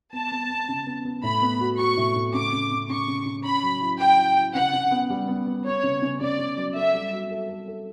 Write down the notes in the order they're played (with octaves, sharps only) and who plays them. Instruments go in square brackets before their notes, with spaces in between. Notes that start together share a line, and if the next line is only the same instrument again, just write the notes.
[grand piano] B3 [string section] A5
[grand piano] B3
B3
C#3
B3
B3
[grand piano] A2 [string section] B5
[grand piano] B3
F#4
[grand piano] F#4 [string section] C#6
[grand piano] A2
A2
[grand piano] C#3 [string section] D6
[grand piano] C#3
C#3
[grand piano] C#3 [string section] C#6
[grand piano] C#3
C#3
[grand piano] C#4 [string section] B5
[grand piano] F#3
E4
[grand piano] E4 [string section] G5
[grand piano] E4
E4
[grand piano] C#3 [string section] F#5
[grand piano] C#3
B3
G3
B3
B3
[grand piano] B3 [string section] C#5
[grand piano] C#3
C#3
[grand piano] C#3 [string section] D5
[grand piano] C#3
F#3
[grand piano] A4 [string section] E5
[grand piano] G3
F#4
A4
A4
A4